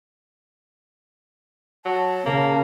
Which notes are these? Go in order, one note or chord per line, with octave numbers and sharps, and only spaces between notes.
F#3 A5
C#3 A#3